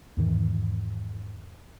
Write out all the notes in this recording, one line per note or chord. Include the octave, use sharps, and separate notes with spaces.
E2 G#2 D#3 E3